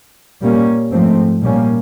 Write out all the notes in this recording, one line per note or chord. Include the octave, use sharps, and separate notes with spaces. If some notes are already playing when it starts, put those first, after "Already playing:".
A#2 G3 A#3 C#4
G#2 F3 A3 C4
A#2 G3 A#3 C#4